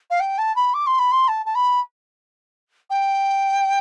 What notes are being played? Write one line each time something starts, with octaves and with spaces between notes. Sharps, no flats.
F5
G5
A5
B5
D6
C6
B5
C6
A5
A5
B5
G5